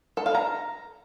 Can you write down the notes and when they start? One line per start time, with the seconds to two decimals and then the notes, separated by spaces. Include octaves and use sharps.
0.17 A4
0.26 F5
0.35 A#5